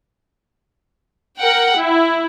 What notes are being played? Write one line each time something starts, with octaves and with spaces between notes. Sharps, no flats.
A#4 F#5 G5
E4